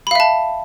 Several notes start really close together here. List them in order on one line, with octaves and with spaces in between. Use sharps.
B5 F5 E5 A5